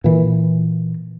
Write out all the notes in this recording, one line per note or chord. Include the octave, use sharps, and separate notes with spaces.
A#2 E3